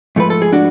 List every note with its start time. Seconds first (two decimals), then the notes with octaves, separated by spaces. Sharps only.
0.16 G#2 F3 A3 B4
0.30 A4
0.42 G#4
0.53 D4 F#4